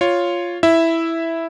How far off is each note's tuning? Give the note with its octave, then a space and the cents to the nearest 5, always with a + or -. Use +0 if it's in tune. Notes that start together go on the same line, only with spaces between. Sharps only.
F4 +0 C#5 +0
E4 +0 E5 +0